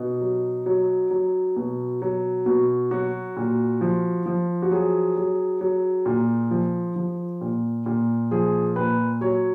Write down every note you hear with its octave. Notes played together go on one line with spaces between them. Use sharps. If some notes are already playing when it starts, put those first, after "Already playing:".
Already playing: B2 D#4
F#3
F#3
F#3
B2
F#3
B2
F#3 F#4
A#2
F3
F3
F#4
F#3 G#4
F#3
F#3
A#2
F3
F3
A#2
A#2
F3 G#4
A#2 B4
F#3 C#5